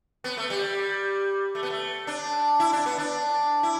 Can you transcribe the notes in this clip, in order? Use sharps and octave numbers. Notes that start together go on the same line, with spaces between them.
B3
A3
G3
A3
B3
A3
D4
E4
D4
B3
D4
E4